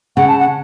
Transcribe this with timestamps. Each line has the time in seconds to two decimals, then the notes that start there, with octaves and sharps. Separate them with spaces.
0.16 C#3 F#5
0.28 A5
0.39 F#5